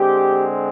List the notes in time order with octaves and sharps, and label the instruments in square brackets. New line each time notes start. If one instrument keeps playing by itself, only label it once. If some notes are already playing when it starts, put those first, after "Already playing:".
Already playing: [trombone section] D3 G#3 C4 G4